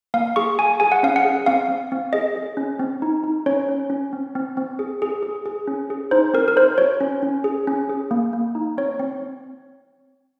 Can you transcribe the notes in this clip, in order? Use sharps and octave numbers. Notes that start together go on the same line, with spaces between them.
A#3 F5
G#4 C#6
G#4 G#5
G#4 G#5
F#5
C#4 F5
F#5
G#4
C4 F5
C4
C4
G#4 D#5
G#4
C#4
C4
D#4
D#4
C#4 C#5
C#4
C#4
C4
C4
C4
G#4
G#4
G#4
G#4
C#4
G#4
D#4 C5
C4 A#4
A#4
D#4 C5
F#4 C#5
C#4
C#4
G#4
C#4
G#4
A#3
A#3
D#4
C4 C#5
C4